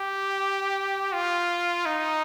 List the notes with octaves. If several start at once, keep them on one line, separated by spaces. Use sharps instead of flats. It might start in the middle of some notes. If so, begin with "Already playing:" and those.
Already playing: G4
F4
D#4